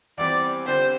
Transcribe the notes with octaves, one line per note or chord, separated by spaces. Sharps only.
E2 E3 G3 C4 G4 D5
D3 C4 G4 C5